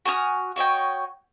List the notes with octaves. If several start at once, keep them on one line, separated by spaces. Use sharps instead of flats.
F#4 G#5 D#6 F6
F#4 C#5 D#5 G5